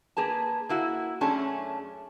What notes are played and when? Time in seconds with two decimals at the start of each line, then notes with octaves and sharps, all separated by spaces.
0.17 A#3 G#4 B4 A5
0.69 A#3 E4 F#4
1.21 F#2 A3 C#4 D4 G#4 A5